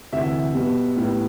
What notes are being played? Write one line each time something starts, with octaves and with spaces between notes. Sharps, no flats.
D2 C3 E3 E5
B2 G3 B3
A2 G3 B3